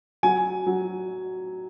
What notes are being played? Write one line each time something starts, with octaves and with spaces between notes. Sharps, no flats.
F#3 G#5
F#3